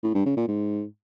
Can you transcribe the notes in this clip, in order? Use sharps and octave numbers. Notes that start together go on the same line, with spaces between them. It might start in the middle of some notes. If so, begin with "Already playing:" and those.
A2
G2
C#3
A#2
G#2